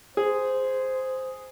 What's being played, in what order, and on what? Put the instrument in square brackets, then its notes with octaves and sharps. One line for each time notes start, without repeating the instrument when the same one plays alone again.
[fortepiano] G#4 [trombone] C5